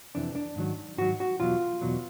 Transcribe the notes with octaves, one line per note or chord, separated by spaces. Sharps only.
F2 C3 E3 D4
D4
G#2 D#3 F#3
G#2 D#3 F#3 F#4
F#4
E2 B2 F#3 F4
E2 B2 F#3